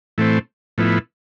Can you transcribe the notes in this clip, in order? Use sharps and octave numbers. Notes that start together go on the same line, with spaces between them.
A2 E3 A3 C4
A2 F3 B3 E4